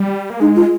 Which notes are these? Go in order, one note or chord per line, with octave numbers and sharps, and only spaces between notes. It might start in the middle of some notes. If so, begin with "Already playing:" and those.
Already playing: G3
A#3
G#3 D#4
F4